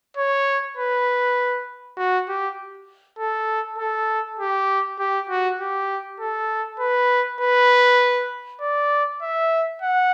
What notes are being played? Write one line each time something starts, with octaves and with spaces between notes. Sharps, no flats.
C#5
B4
F#4
G4
A4
A4
G4
G4
F#4
G4
A4
B4
B4
D5
E5
F#5